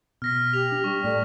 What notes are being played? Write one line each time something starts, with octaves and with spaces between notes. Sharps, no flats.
B2 F6 A#6 B6
G4 F7
D4
G3 C#6
A2 A4 D5